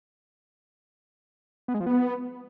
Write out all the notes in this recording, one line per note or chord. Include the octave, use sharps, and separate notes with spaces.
B3
G#3
F3
B3